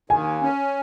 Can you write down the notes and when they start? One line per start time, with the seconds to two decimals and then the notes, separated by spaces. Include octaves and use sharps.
0.10 D#2 G#5
0.42 C#4